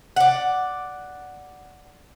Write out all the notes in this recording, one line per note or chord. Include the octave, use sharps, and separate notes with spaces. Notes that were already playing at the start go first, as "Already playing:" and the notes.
D5 F#5